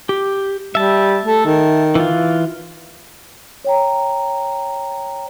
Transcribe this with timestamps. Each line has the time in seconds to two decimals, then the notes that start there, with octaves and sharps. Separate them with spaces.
0.09 G4
0.75 G3 E5 A5
1.25 A3
1.45 D#3
1.95 E3 F4
3.64 C#5 G5 A#5